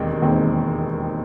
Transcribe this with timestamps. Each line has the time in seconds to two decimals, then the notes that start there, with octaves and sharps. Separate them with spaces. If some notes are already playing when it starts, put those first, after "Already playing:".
Already playing: E1 D#2 D#3 G#3 C4
0.22 E1 D#2 D#3 G#3 C4